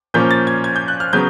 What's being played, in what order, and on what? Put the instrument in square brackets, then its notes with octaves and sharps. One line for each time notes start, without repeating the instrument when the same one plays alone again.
[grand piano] A#2 F3 A#3 C#4 G6
A6
G#6
G#6
G6
F#6
F6
C#3 F#3 B3 G6